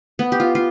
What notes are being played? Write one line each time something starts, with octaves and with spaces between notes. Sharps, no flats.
B3
G4
F4
F4